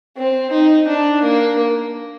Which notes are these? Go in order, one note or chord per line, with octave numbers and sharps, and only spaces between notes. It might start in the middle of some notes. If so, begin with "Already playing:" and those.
C4
D#4
D4
A#3